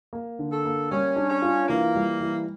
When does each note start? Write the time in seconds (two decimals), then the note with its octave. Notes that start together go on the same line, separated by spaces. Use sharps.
0.13 A#3
0.39 D3
0.52 A4
0.65 A#3
0.91 G3 C#4
1.16 D4
1.30 C#4
1.42 F4
1.68 E3 A#3
1.95 G3
2.20 E3